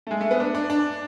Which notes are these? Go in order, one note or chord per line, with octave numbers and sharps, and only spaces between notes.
A3
G#3
A3
B3
D4
D4
D4